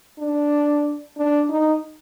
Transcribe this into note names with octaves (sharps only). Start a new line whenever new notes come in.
D4
D4
D#4